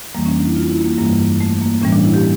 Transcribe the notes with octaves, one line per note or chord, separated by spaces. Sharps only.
F2 E3 G3 A#3
C#4
D4
E4
F4
E4
A#3
G2 E3 G3 A#3
A3
A#3
A2 E3 G3 C#4
D4
E4
G4